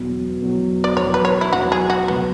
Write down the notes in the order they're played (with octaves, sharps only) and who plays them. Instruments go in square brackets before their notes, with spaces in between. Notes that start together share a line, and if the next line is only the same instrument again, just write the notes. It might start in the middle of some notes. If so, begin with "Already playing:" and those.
Already playing: [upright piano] E2 B2 F#3
E2 B2 F#3
[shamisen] D5
[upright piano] E2 B2 F#3 [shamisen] C#5
[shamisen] B4
C#5
E4
[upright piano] E2 B2 F#3 [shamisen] F#4
[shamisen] G#4
F#4
[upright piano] C#2 B2 F#3 [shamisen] B3